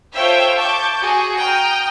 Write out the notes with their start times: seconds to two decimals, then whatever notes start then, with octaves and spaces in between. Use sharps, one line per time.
0.15 F4 A4 C5 C#5 E5 G5
0.57 A5 C#6 D6 G6
1.00 F#4 G#4
1.39 G5 A#5 D#6 F6